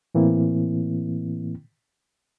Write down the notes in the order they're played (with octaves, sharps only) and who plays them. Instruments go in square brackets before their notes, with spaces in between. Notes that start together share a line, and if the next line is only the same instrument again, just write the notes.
[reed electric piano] A2 E3 A#3 C4 E4